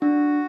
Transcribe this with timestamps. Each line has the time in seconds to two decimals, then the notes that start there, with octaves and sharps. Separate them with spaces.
0.01 D4 F#4